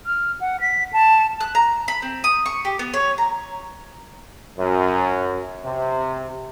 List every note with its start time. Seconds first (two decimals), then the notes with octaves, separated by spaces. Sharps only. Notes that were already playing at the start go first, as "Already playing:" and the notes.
0.06 F6
0.41 F#5
0.61 B6
0.93 A5
1.41 F#6
1.55 A#5
1.88 B5
2.02 C4
2.24 D#6
2.46 C#6
2.65 G4
2.79 B3
2.94 C#5
3.18 A#5
4.59 F#2
5.65 C3